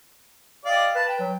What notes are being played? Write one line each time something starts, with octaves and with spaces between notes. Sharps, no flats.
G4 D5 D#5 F5
B4 A5
G5
F#3